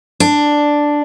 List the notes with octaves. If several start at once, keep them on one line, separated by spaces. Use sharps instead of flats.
D4